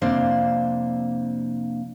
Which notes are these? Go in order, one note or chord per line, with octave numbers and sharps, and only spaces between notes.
F2 C3 A#3 D4 C5 F5